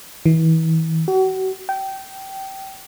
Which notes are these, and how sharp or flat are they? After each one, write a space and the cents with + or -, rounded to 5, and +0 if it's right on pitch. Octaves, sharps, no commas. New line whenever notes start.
E3 -35
F#4 +35
G5 -20